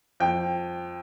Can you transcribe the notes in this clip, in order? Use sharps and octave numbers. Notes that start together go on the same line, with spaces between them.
F2 G5